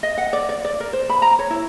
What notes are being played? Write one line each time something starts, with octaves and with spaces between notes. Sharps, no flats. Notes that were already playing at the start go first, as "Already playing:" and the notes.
D#5
F#5
D5
D5
D5
A#4
C5
B5
A#5
C#5
E4